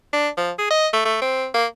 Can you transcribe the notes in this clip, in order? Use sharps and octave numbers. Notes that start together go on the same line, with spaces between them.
D4
F3
G#4
D#5
A3
A3
C4
A#3